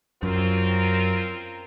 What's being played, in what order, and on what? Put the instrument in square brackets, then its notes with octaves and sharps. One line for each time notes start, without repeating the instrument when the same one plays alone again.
[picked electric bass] F#2 [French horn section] C4 F4 A#4